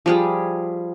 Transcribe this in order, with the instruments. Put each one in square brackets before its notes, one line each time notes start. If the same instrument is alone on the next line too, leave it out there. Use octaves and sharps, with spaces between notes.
[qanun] F3 G3 G#4